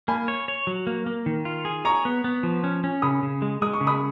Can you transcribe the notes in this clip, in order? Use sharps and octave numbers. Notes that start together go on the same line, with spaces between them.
A#3 G#5 B5
C#5
C#5
F#3
A#3
A#3
D#3
F4
G#4
C#5 A#5 C#6
B3
B3
F3
C#4
C#4
C#3 B5 D#6
C#3
G#3
G#3 D#6
C#6
C#3
B5 D#6